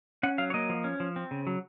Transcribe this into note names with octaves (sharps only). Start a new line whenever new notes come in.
C#4 F#5
F#3 F5
C#5
A#3 D#5
F3
C#4
F3
C4
C#3
F#3